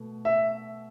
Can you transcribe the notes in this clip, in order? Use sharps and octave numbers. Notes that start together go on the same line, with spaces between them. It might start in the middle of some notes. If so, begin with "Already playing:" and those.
Already playing: B2 A3
E5